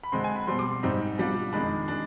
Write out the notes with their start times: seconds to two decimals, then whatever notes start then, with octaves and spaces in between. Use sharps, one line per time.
0.03 B5
0.12 D3 G#3 C4 C6
0.24 G#5
0.36 B5
0.47 B2 G3 C4 C6
0.59 D6
0.71 C6
0.83 G#2 G3 C4 D#4
1.18 B2 G3 D4 F4
1.53 F2 D#3 G#3 D4 B5
1.88 G#3 D4